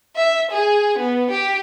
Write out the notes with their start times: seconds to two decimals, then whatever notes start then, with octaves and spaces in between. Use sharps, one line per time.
0.16 E5
0.51 G#4
0.99 B3
1.31 G4